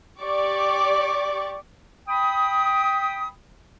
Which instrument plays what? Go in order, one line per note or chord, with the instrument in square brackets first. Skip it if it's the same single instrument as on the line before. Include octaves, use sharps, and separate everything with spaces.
[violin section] G4 D5 C#6 D6
[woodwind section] G5 B5 D#6